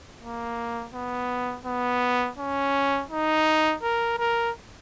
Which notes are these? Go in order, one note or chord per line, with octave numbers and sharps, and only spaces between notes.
A#3
B3
B3
C#4
D#4
A#4
A#4